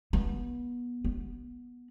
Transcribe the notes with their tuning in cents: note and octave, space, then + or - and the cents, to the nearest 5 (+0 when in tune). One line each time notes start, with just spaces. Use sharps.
B3 -25
B3 -15